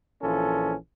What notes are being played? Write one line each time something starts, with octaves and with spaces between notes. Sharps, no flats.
A#1 E3 C#4 F4 A4